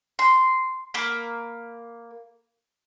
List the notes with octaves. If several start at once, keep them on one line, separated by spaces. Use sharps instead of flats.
C6
A#3 B5